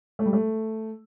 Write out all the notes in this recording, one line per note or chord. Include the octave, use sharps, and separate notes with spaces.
A3
G3
A3